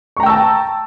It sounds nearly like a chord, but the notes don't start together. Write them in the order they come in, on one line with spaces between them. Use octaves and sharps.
C#6 A#5 G5 E6 A5